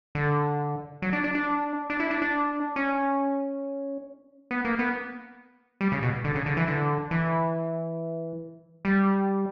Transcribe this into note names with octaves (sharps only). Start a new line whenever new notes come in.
D3
F#3
D4
D4
D4
D4
E4
D4
D4
C#4
B3
A#3
B3
G3
C#3
B2
D3
C#3
D3
E3
D3
E3
G3